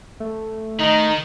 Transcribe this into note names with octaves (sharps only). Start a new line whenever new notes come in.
A3
D#3 D#4